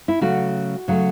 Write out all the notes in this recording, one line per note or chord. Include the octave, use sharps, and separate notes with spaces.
E4
C#3 F#3 A3 F#4
C#3 F#3 A3